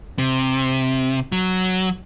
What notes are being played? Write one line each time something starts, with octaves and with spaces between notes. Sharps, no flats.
C3
F#3